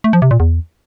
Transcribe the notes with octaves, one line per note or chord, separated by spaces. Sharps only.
A3
F3
C3
A#2
E2